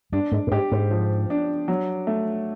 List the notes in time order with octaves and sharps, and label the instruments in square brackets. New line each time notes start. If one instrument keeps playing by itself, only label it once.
[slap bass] G2 [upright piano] D4
[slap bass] G#2
A2
[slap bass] G#2 [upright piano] G4
[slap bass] G#2
[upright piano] F3
D4
F#3
A3